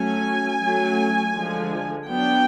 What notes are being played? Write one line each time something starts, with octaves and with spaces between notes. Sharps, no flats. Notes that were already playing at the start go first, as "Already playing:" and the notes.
Already playing: F#3 A3 C#4 G#5
F#3 A3 C#4
D3 F3 G#3
F#3 B3 D4 G5